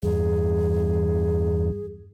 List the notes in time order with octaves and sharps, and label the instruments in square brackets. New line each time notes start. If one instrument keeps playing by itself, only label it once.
[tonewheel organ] E2 G2 [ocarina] G#4